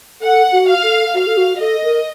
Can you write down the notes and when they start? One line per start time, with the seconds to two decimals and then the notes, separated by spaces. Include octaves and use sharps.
0.21 A4 F#5
0.52 F#4
0.68 F5
0.83 A4
1.14 F#4 F5
1.27 A4
1.37 F#4
1.60 A4 D#5
1.83 A#4